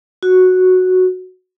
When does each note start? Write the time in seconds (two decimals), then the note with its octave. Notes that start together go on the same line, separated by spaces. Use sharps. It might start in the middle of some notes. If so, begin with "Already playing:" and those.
0.23 F#4